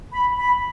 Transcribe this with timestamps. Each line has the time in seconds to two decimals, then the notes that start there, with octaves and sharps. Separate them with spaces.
0.12 B5
0.38 B5